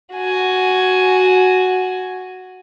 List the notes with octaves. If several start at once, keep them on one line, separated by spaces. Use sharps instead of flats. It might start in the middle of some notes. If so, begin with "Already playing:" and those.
F#4 G#5